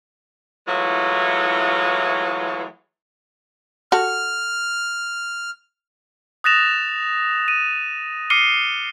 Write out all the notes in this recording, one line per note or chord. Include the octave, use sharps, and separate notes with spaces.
E3 F#3 G#3 A3 E4 F4
F#4 A4 F6
D#6 F#6 A6 A#6 E7 F7
D#7
D6 F6 C7 C#7 D#7 G7